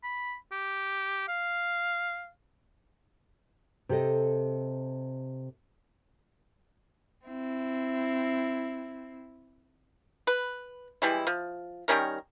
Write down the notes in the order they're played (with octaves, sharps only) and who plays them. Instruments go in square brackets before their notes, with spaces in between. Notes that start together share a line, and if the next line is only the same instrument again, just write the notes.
[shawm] B5
G4
F5
[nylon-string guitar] C3 G4 A4 D#5
[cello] C4 E4
[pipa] B4
E3 G3 G#3 E4
F3
D#3 G3 C#4 A#4